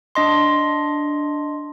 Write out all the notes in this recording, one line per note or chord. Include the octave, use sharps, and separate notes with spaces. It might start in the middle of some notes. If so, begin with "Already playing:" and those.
D4 D#5 C6